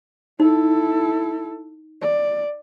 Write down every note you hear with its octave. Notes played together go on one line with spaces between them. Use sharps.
D#4 E4 A4
D5